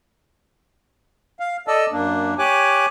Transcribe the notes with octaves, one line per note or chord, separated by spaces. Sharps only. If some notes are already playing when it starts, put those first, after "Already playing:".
F5
A4 D5 D#5 A5 E6
F#2 A#3 D4
G4 C#5 G#5 D6 F#6